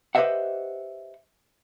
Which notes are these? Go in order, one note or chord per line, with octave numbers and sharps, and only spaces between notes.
G4 B4 C5 D#5 E5 F#5